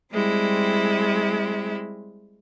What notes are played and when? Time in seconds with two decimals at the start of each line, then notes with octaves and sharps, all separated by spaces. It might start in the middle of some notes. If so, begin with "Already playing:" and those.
0.12 G3 G#3 C4 E4